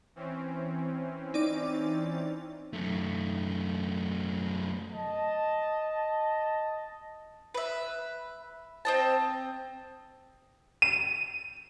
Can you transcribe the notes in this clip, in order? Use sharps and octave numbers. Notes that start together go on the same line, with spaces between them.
E3 C4 C#4
D#4 D5 D6
F#2 A3
D#5 A5
B4 E5
C4 D#5 A5
D#7